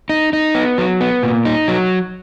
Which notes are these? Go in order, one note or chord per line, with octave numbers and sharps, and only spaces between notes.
D#4
D#4
B3
F#3
B3
A#2
D#4
F#3